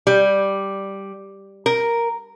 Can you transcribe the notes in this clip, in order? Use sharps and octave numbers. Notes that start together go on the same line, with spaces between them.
G3
A#4